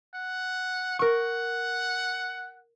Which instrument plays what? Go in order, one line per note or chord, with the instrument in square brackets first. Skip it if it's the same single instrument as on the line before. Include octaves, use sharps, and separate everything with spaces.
[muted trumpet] F#5
[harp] A#4 C#6 [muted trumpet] F#5